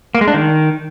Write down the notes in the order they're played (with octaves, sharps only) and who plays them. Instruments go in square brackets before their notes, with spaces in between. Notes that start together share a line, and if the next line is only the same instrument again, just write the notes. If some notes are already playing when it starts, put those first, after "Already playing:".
[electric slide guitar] A#3
G#3
D4
D#3